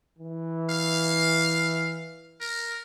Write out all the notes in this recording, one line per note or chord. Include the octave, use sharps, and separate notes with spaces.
E3
F5
A#4